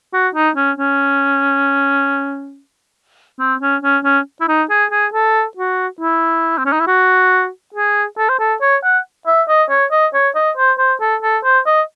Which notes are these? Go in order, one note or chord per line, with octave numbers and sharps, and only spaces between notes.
F#4
D#4
C#4
C#4
C4
C#4
C#4
C#4
E4
D#4
G#4
G#4
A4
F#4
E4
C4
C#4
D#4
E4
F#4
G#4
A4
C5
A4
C#5
F#5
E5
D#5
C#5
D#5
C#5
D#5
C5
C5
A4
A4
C5
D#5